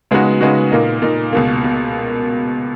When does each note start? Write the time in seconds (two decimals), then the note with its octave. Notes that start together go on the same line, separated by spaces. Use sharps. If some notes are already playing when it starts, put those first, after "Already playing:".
0.11 C#3 G#3 B3 D#4 F#4
0.41 C#3 G#3 B3 D#4 F#4
0.71 A#2 A#3 D#4
1.02 A#2 A#3 D#4
1.33 C#2 B2 A#3
1.64 B2